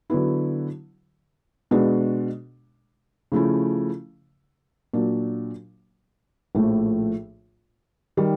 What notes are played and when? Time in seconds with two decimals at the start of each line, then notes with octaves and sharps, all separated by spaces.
0.10 D3 F#3 B3 E4
1.71 B2 G#3 B3 D4 F#4
3.32 C#3 F3 A3 C#4 E4
4.93 A#2 F#3 A#3 D4
6.55 A#1 A2 F3 A3
8.17 D#3 G3